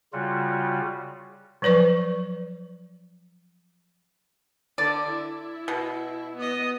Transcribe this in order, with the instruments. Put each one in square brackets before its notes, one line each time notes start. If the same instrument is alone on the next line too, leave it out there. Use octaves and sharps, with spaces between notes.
[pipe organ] C#3 G3 F4 F#4
[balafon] F3 F#3 B4 D5 C#6
[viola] D3 [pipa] D5
[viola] E4
[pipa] B2
[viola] B3 D#5